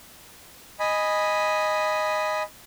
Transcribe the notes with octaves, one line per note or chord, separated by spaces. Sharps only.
D#5 G#5 B5